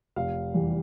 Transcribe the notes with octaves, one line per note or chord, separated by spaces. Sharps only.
F1 F5
E2 E3 G3